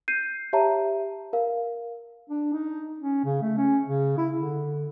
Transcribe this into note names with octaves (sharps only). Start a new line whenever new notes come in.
G6 C7 D#7
G4 C#5 E5 A5 A#5
A#4 F5
D4
D#4
C#4
C#3
A3
C#4
C#3
E4
D3